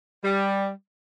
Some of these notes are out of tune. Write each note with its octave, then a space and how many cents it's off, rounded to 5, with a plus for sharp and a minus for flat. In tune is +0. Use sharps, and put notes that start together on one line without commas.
G3 +5